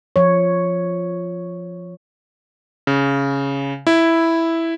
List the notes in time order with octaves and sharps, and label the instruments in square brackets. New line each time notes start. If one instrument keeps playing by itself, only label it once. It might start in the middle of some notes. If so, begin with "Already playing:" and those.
[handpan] F3 C#5
[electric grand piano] C#3
E4